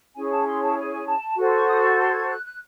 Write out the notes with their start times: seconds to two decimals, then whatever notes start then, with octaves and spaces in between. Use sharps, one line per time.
0.15 C#4 E4 G#4 C#5 G#5
0.25 G#5
0.30 A5
0.45 C6
0.60 A5
0.76 G#5
1.06 A5
1.37 F#4 A4 C5
1.52 C#6
1.67 D#6
1.82 C#6
1.97 C6
2.12 G#6
2.27 F#6
2.43 F#6